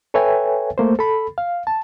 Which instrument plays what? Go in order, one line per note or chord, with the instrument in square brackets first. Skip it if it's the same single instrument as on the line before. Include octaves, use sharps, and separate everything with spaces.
[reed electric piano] A4 B4 C#5 E5 G5 G#5
A3 A#3 C5
A4 B5
F5
A5